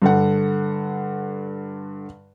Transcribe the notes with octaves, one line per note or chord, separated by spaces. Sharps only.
G2 D3 F#5